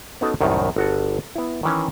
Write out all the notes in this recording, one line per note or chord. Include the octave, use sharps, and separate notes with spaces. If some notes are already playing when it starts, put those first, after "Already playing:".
B3 C#4 D#4 F#4 A4 B4
C2 F#2 A2 D#3
G1 F#4 F#5 A5
B3 E4
D#3 E3 C#4